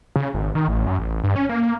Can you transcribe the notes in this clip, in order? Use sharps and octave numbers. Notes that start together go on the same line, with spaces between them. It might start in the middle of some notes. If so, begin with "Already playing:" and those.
C#3
G#1
D#3
A1
F#2
A1
G2
C#4
A#3